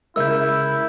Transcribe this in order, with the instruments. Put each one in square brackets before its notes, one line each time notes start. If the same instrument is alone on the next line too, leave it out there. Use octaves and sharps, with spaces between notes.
[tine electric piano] C#3 G#3 [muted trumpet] E4 [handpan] A#4 E5 [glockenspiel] E6 G6